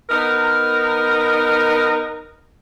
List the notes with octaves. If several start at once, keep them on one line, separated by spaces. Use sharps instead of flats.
B3 D#4 A#4